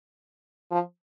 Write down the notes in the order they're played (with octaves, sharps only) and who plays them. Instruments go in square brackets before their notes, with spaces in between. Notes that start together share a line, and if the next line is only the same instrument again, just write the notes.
[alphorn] F3